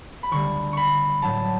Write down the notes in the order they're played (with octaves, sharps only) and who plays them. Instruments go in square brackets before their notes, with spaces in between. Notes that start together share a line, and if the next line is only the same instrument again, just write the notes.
[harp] B5
D2 D3 G3 C#6
B5 C#6
A2 F#3 A5